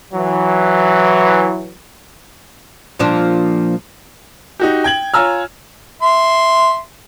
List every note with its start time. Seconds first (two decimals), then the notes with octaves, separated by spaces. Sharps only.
0.12 E3 F#3
2.99 A#2 F3 D4
4.60 D#4 F#4 G4
4.84 G5 G#6 F#7
5.14 F4 C#5 G#5 A#5 E6 F6
6.02 E5 C6